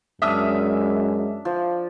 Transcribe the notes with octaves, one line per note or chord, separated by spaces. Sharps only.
F#2 G#3 D4 E5 D#6 F6
F3